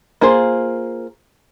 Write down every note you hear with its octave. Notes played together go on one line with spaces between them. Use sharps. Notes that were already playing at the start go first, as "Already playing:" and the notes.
A#3 F4 G#4 C5